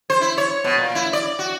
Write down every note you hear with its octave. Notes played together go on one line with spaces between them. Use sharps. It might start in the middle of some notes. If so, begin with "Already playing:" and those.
C5
E4
C#5
B2
A#2
E4
D5
F#4